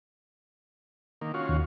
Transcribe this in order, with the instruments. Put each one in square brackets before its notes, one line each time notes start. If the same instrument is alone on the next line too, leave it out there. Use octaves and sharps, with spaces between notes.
[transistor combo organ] D#3 A#3
C#4 F4 F#4
[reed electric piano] D#2